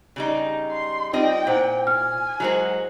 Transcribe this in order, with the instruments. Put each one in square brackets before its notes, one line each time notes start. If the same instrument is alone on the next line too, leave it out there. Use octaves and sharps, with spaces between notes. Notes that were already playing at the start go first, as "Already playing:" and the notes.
[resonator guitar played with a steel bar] C#3 G3 D#4
[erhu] C6
[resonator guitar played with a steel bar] G3 C4 D#5 [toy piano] D#4 F4 [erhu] G5
[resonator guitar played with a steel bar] A#2 [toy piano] E4 C5 F#5
[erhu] G#5 [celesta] F6
[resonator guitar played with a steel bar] F#3 G#3 F#4 [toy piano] E4 A#4 C5